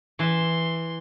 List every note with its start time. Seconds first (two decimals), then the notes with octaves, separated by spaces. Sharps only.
0.19 E3 E5 C6